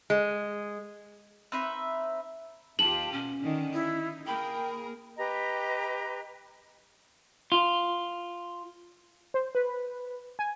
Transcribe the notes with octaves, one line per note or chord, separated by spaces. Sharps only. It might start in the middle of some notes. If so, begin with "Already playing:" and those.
G#3
C4 D#4 B4 E5
D#2 F4 G4 A5 F#7
B2 C#4
D3 D#3
D#4 E4
A#3 G#4 A#4 G5 B5
G4 B4 D#5 A#5
F4
C5
B4
G#5